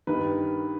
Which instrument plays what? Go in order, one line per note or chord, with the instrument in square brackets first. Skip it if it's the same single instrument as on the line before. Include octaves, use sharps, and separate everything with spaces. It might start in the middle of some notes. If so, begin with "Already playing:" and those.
[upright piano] G2 D#3 B4